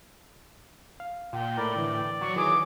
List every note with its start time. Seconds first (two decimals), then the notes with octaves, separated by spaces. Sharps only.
1.00 F5
1.33 A#2 F4 G5
1.57 A2 A#4 D5 B5
1.76 D3 E3
2.21 F#3 C#6
2.36 D#3 E3 G#4 D6